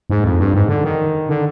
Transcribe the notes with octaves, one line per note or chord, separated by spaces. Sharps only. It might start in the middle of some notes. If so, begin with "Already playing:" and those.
G#2
F2
G2
G#2
D3
D#3
D3